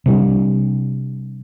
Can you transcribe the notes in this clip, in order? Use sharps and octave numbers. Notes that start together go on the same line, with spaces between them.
C3 G3 D4